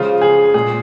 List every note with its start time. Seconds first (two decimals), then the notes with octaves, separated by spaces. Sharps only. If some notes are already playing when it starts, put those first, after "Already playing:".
Already playing: C#3 F3 G#3 F4
0.21 G#4
0.54 A#2 G#3 G#4